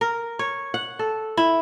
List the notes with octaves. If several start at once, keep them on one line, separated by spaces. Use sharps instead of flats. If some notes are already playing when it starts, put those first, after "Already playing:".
A#4
C#5
F#5
A4
E4